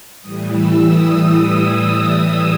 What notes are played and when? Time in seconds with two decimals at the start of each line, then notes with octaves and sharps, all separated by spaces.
0.22 A2 E3 G3 D#6
0.53 E6
0.84 D#6
1.46 D#6
1.77 D#6
2.08 D#6